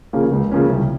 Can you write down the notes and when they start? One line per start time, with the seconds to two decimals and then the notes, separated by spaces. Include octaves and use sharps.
0.13 C#3 F3 A#3 C#4
0.31 C#2
0.51 C#3 F3 A#3 C#4
0.70 C2